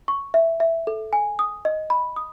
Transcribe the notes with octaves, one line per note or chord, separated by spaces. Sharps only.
C#6
E5
E5
A4
G#5
D#6
D#5
B5
D#6